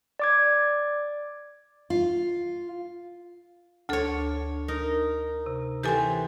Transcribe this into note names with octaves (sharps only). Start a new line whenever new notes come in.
D5 D6 G#6
F4
D2 D4 A4 C#5
D#4 A#4
C3
E3 C4 G4 A4 G#5